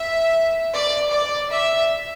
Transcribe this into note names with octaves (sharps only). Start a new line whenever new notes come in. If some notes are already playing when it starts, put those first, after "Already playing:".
Already playing: E5
D5
D5
E5